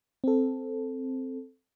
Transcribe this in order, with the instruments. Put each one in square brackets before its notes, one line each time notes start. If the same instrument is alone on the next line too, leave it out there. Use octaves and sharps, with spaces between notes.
[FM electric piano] C4 A4